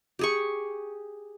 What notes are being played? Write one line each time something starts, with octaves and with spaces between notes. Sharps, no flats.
G4 G#4 C#6